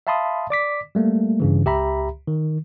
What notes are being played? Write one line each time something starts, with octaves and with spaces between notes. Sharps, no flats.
E5 F5 A5 B5 C6 D#6
D5 D6 B6
G3 A3 A#3
G2 C#3 E3
C#2 G4 E5 A#5 B5
D#3